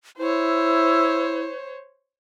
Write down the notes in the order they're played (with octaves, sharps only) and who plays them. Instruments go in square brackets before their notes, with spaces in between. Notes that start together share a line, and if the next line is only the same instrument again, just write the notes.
[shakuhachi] E4 [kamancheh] C5 C#5